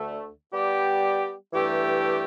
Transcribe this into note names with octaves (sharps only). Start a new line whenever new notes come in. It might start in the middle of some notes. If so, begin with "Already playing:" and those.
Already playing: D2 D3 A3
G3 B3 G4 D5
G2 E3 A3 G4